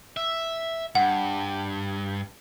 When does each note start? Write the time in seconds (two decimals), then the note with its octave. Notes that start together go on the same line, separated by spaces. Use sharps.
0.17 E5
0.95 G2 F#5